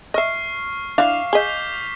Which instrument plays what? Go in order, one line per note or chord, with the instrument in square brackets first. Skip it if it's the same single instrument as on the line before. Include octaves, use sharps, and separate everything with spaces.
[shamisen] D#5 E5 [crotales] C#6 F6 C7
[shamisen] D4 E4 [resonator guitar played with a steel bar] F5 [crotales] D6
[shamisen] G#4 D#5 [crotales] G6 B6 G7